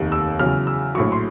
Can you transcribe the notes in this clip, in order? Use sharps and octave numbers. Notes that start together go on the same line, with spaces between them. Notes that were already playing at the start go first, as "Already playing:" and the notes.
Already playing: F1 D#2 D#3
E6
E2 C#3 F#3 F6
E6
A#1 A2 F#3 C#6
C6